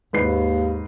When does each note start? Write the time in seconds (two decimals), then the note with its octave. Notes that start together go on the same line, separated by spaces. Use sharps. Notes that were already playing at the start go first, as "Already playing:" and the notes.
0.13 D#2 G#2 B4 C7